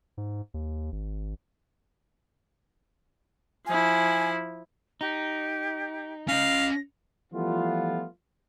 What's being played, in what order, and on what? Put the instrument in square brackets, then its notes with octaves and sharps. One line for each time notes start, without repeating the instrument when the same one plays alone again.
[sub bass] G#2
D#2
G#1
[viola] F3 E4 [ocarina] G#5
[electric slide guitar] D#4 [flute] G4
[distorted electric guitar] C#4 D#5 [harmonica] F5 [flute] A#6
[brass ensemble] E3 F3 G3 A3 B3 F4